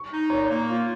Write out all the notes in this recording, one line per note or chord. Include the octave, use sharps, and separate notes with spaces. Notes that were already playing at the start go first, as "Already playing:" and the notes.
Already playing: C#6
D#4
A#2 C#5
A#3
F4